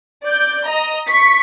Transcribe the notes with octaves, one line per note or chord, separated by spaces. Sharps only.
D5 G6
D#5 A#5
C#6 B6